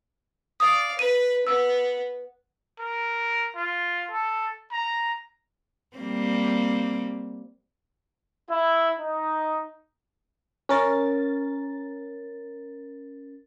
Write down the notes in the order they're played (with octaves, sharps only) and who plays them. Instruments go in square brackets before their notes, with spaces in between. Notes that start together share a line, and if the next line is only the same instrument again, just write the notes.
[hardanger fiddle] D5 F5 [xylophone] D#6
[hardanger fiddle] B4 [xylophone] D#7
[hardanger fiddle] B3 [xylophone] E6
[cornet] A#4
F4
A4
A#5
[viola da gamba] G3 A#3 C4
[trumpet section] E4
D#4
[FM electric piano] C#4 A#4 A6